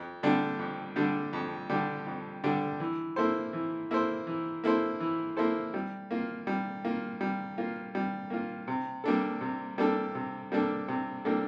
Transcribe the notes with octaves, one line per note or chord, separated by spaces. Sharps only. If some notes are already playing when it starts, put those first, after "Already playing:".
Already playing: F2
D3 G3 D4 G4
F2
D3 G3 D4 G4
F2
D3 G3 D4 G4
F2
D3 G3 D4 G4
E3
A#3 E4 A4 C5
E3
A#3 E4 A4 C5
E3
A#3 E4 A4 C5
E3
A#3 E4 A4 C5
G3
A#3 F4
G3
A#3 F4
G3
A#3 F4
G3
A#3 F4
C3
G3 A#3 D4 A4
C3
G3 A#3 D4 A4
C3
G3 A#3 D4 A4
C3
G3 A#3 D4 A4